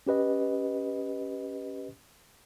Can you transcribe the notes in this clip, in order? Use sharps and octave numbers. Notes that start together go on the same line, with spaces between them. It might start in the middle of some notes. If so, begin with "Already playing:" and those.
C#4 G4 B4 D#5